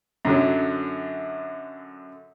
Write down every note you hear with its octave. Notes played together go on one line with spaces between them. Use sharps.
F#2 D3 F#3